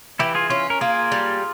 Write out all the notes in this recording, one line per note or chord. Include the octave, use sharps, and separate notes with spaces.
E3 E4 G4
F4 G#4
C#4 F4
A#4
A#3 F4 G#4
G3